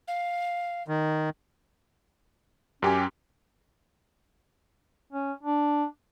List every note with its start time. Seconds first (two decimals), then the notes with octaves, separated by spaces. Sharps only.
0.08 F5
0.88 D#3
2.82 F#2 C#4 G4 G#5
5.13 C#4
5.43 D4